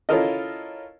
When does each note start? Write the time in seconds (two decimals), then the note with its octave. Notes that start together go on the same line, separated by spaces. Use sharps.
0.09 C#4 E4 F4 A4 A#4 D#5